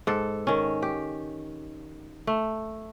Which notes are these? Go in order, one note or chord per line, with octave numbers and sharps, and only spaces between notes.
G#2 A4
D#3 C#4
G4
A3